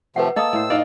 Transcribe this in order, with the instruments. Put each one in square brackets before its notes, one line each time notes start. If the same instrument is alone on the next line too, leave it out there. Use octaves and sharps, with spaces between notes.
[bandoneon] C3 F3 A3 [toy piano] B4 F#5
[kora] A#3 A4 [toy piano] D#5 D#6 [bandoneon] E6
[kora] A2 C5
[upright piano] D#4 F5 [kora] D5 [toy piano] D#5